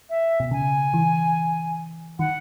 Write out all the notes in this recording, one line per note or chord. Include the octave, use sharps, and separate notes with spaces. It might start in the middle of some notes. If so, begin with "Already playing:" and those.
E5
B2
C#3 G#5
E3
D#3 F#5